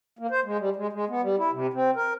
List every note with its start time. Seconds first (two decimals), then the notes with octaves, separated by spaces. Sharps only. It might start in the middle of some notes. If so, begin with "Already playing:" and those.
0.19 A#3
0.31 C5
0.45 G#3
0.59 G3
0.76 G#3
0.93 G#3
1.09 B3
1.21 G3
1.38 E4
1.53 C3
1.73 C4
1.96 A#4